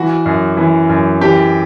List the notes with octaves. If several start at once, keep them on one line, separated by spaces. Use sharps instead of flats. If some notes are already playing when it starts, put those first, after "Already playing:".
Already playing: E3 F#4
F#2
E3
F#2
E3 G4